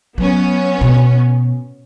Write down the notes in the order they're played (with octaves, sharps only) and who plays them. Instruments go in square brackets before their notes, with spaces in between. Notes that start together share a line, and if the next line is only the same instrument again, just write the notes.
[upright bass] F#3 [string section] B3 C#4
[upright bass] B2